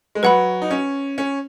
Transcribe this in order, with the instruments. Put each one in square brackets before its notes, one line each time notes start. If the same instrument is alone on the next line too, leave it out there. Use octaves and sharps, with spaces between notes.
[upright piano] G#3
[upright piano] F#3 [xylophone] B4 F#5 B5
[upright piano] D#4
C#4
C#4